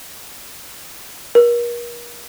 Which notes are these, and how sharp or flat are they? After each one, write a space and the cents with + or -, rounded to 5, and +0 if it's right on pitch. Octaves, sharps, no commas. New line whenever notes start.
A#4 +35